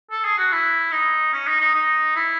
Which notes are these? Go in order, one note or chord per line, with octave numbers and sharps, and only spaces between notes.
A4
G#4
F#4
E4
D#4
C#4
D#4
D#4
D#4
E4